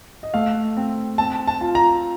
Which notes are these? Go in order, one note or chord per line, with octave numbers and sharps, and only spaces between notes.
D#5
A3 F5
C4
C4 A5
A5
F4
A#5